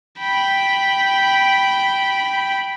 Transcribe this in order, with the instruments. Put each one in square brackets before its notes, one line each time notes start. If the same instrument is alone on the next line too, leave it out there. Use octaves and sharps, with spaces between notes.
[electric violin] G5 B5